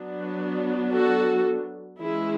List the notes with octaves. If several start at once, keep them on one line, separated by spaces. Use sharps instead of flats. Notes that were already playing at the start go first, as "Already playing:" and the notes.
Already playing: F#3 B3 D4
F#4 A4
E3 G#3 C#4 E4 G#4